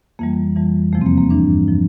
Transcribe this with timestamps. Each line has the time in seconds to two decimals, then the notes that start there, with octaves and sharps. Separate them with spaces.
0.19 F2 E3 G3 A#3
0.56 F2 E3 G3
0.93 E2 C3 F3 A3
1.01 C4
1.06 A#3
1.18 A#3
1.30 G2 E3 G3 D4
1.68 F3